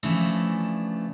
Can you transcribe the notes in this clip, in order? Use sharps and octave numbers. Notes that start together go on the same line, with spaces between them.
C#3 E3 F3 A3 D4